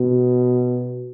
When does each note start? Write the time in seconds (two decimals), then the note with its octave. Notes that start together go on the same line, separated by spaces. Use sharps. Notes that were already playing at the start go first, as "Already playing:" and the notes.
Already playing: B2